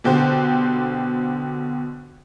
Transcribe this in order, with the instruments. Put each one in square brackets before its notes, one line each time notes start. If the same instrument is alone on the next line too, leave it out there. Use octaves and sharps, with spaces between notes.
[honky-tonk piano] B2 D3 G4 C5